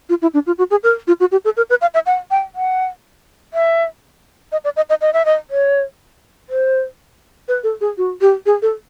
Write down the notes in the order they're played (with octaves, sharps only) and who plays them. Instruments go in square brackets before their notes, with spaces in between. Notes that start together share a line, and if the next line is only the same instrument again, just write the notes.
[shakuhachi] F4
E4
D4
F4
F#4
G#4
A#4
F4
F#4
G4
A4
A#4
B4
F5
E5
F#5
G5
F#5
E5
D#5
D5
D#5
D#5
D#5
E5
D#5
C#5
C5
B4
A4
G#4
F#4
G4
G#4
A4